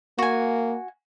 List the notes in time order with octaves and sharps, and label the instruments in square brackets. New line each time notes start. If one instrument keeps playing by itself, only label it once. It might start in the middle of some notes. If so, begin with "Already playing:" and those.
[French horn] A#3 [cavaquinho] F#4 G#5